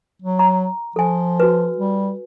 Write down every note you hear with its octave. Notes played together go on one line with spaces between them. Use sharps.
F#3
A#5
F3 A4 G#5
F#4 B4
G3